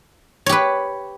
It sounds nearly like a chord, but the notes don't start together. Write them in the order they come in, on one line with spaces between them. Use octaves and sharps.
C#5 G4 B4